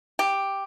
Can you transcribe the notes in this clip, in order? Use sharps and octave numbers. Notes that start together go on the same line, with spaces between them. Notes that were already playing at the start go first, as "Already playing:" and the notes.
G4